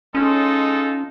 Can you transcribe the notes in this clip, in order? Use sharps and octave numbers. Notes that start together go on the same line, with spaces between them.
G#3 C#4 D#4 F4 A4